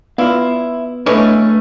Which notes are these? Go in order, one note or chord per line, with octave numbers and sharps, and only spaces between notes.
B3 E4 F4 D5 F5
E3 G#3 A3 C#4 D4 A4 B4